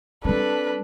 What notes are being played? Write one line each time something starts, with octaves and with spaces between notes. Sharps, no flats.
G3 C4 D4 A4 B4